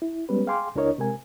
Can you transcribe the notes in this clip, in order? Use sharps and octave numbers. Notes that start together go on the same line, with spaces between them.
E4
G3 G#3 B3 C#4 B4
G#4 F5 G5 G#5 C6 D6
C#2 D4 E4 A#4 C#5 D#5
C3 G#3 A#4 G#5